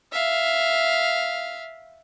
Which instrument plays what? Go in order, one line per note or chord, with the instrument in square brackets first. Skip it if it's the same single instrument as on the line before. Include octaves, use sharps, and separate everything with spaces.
[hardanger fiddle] E5 F5